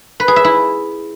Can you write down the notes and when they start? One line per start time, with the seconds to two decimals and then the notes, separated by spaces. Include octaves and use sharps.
0.20 B4
0.28 G#4
0.36 E5
0.44 E4